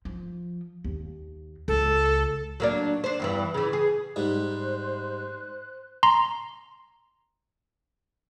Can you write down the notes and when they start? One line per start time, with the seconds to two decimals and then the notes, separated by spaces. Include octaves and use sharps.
0.05 F3
0.84 D#2
1.68 C#2 A4
2.60 F#3 A#3 D4
3.04 D4 C5
3.20 E2 G2 E3
3.54 C#3 E3
3.73 G#4
4.16 G#2 G3 C5 F#6
6.03 A#5 C6